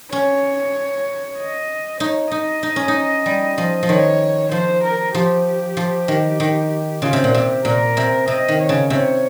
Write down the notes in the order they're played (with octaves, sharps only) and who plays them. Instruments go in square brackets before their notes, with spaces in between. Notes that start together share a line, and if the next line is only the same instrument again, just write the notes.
[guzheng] C#4 [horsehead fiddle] C#5
[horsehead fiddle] D#5
[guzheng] D#4 [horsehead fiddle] C#5
[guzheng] D#4 [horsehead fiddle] D#5
[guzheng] D#4
C#4
D#4
G3
F3
F3
[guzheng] D#3 [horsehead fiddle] C#5
[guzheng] F3 [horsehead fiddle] C5
[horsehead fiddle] A#4
[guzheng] F3 [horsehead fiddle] G4
[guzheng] F3
D#3
D#3
[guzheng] C#3 [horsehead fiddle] F4
[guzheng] C3
A#2
[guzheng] C3 [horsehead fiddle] G4
[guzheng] A#2 [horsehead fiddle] A#4
[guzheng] C3
[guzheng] C3 [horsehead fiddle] D#5
[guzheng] D#3
[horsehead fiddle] C#5
[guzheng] C#3
[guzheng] C3 [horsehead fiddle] C#5